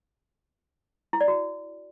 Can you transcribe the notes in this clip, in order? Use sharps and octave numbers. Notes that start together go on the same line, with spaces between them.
E4
D5
F#4